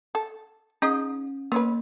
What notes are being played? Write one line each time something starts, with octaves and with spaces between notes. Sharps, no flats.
A4
C#4 D#4 G#4 D#5
A#3 B3 C#4 B4